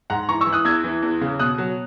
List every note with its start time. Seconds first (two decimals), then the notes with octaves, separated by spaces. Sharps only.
0.10 G#2 F#5 A#5
0.29 E3 A#5 C#6
0.41 C#6 E6
0.47 E3
0.53 D#6 F#6
0.65 E2 E6 G#6
0.84 E3
1.03 E2
1.21 C#3
1.39 B2 D#6 F#6
1.58 F#3